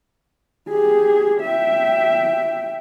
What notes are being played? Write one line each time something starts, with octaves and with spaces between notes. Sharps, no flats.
G4 G#4
E5 G5